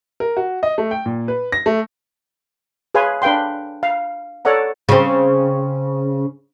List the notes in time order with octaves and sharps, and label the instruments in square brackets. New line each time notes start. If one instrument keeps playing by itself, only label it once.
[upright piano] A#4
F#4
D#5
A3
G5
A#2
B4
A#6
A3
[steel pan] G#4 B4 C#5 F5 G#5 C6
D4 B4 F5 G5 C6
F5
A4 C#5 D5 F#5 A#5
[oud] C#3 C4